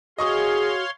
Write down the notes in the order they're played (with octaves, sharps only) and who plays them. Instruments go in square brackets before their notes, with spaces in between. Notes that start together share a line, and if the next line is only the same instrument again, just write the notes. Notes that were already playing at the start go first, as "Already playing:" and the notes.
[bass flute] F#4 [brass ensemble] G#4 [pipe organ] C#5 F5 C6 [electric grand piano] D#5 C#6 D#6